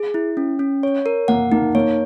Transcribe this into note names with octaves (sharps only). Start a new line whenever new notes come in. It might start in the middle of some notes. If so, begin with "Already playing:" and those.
Already playing: G#4
E4
C#4
C#4
C#5
A#4
A#3 F#5
A#3 D#4
A#3 C#5